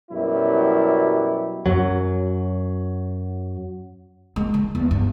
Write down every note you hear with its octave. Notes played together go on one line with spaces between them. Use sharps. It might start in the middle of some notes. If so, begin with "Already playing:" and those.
F#2 B2 F#3 G3 E4 G4
F#2 F#3
G#3
D#3
E2
G2